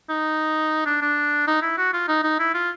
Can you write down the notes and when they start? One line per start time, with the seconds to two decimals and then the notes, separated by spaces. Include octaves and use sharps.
0.09 D#4
0.85 D4
1.01 D4
1.47 D#4
1.62 E4
1.77 F#4
1.93 F4
2.08 D#4
2.23 D#4
2.39 E4
2.54 F4